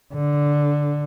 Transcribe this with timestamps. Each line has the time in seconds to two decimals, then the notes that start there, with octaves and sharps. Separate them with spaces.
0.14 D3